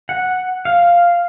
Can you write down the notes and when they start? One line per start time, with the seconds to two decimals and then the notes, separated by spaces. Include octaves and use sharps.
0.09 F#5
0.65 F5